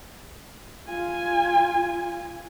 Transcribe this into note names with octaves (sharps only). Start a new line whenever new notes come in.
F4 G#5